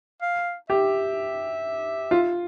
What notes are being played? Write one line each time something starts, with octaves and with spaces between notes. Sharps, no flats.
F5
G4 E5
F4